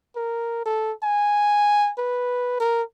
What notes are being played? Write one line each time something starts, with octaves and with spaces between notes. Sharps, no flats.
A#4
A4
G#5
B4
A#4